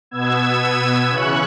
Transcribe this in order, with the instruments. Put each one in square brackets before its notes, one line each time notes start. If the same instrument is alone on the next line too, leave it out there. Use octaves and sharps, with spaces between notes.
[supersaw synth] B2 B3 E6 G#6
C#3 E3 C#4 C#6 F#6